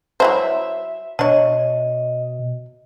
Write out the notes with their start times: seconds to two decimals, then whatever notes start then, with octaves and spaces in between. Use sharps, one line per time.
0.20 F#3 E4 C5 E5
1.19 B2 D4 C#5 D#5